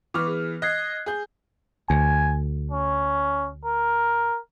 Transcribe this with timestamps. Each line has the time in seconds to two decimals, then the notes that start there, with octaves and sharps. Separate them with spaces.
0.14 E3 B3 C#6 D6 F6
0.27 G#4
0.62 D#5 F#6 G#6 C7
1.06 G#4 G6
1.90 D2 G#5
2.71 C#4
3.65 A#4